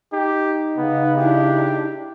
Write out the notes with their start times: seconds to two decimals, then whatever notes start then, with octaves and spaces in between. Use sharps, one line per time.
0.13 D#4 G4
0.78 C#3 B3
1.18 D4 E4 G4